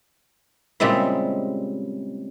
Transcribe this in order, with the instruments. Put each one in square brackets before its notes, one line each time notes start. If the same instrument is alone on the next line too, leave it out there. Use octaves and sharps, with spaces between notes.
[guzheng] A#2 C#3 G3 G#3 C4 E4